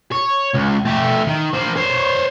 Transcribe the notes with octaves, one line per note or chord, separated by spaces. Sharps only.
C#5
C#2
A3 G4
D#3
A#3 C5
C5 C#5